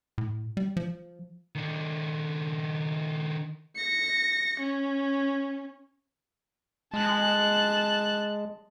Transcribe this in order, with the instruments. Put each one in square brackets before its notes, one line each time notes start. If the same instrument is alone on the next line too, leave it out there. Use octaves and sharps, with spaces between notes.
[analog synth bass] A2
G3
F3
[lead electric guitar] D#3 D4
[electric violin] A#6 C#7
C#4
[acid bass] G#3 [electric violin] A5 F#6